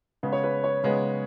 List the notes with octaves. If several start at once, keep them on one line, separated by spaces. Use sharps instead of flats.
C#3 G#3 B3
C#5
B4
C#5
C#3 G#3 B3